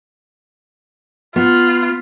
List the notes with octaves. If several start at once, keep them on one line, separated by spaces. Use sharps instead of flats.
B3 F4